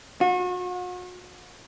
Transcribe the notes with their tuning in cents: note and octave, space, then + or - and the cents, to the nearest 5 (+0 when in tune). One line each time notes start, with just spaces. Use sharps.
F#4 -40